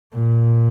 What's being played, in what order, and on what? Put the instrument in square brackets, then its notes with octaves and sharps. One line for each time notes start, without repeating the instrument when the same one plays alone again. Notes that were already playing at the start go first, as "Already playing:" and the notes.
[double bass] A#2